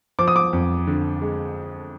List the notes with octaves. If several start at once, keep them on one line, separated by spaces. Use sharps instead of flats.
F3 D6
D#6
D6
F2
D3
G#3